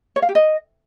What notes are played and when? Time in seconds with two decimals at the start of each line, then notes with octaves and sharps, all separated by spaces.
0.16 C#5
0.22 F5
0.29 G4
0.35 D#5